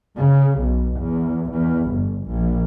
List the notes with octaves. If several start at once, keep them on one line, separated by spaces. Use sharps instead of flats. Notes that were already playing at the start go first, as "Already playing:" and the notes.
C#3
B1
E2
E2
G1
A#1